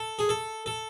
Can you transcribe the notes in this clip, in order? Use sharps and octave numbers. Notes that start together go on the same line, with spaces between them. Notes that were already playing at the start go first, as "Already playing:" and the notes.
Already playing: A4
G#4
A4
A4